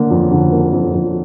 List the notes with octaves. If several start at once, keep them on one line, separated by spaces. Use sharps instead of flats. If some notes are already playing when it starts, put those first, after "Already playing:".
Already playing: D3 A#3
F2
D3
A#3
F2
F2